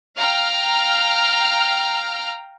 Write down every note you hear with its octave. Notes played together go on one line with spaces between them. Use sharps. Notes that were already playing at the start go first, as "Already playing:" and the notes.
F5 G5 A#5 F6